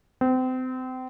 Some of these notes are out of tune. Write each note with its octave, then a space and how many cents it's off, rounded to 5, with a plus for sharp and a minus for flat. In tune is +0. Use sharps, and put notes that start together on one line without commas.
C4 -30